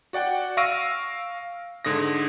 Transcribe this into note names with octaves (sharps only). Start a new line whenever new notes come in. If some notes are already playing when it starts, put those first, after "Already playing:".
F#4 D5 F#5 G5
F5 C#6 E6 A#6 D7 D#7
G#2 D3 D#6 A#6